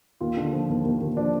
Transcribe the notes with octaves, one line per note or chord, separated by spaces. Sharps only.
D#2 F4
D3
F3
D#2
D#2
D#2
F3 D4